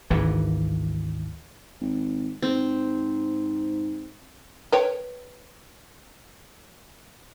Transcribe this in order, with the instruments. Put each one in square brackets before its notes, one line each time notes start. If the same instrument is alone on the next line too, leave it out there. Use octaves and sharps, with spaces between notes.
[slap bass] G#1 D2 E3
[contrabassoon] G#1
[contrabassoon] G#2 [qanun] C4
[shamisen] B4 C#5 G5